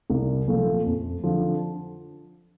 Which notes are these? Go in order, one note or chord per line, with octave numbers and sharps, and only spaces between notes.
C2
A#2 F3 A3
F2
D3 F3